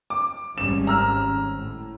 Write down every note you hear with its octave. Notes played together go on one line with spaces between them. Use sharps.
D6
G#1 G3 C#4 E7
A#5 E6 F6
A2